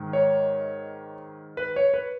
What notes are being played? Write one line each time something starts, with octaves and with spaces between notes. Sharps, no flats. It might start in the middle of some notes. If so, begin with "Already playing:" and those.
Already playing: G#2 D#3
C#5
B4
C#5
B4